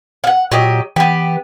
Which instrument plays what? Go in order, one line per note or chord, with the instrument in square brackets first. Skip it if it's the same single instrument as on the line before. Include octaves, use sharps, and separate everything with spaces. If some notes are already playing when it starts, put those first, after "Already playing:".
[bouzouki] F5 F#5
[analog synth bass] A#2 [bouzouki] F#3 G4 D#5
[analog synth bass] E3 [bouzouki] B3 G4